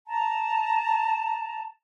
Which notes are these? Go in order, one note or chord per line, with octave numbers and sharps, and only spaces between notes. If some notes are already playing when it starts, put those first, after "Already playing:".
A5 A#5